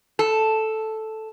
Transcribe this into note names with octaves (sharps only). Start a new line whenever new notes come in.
A4